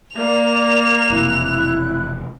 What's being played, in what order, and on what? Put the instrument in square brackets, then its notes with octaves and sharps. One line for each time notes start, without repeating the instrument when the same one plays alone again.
[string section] A#3 [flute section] D5 [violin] F7
[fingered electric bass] E1 F2 C3 [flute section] E4 F#6